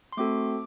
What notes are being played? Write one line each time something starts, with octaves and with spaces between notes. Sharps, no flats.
C6
A3 C4 F#4 A4 D6